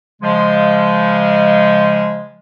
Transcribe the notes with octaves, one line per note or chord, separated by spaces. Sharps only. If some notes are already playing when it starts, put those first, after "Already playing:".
C#3 F3 G#3